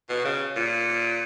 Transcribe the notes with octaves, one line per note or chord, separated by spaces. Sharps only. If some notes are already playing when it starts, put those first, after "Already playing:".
B2
C#3
A#2